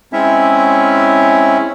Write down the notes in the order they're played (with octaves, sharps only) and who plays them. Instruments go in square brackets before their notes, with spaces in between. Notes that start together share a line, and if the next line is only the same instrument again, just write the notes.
[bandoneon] G#3 C4 C#4 E4 C#5 E5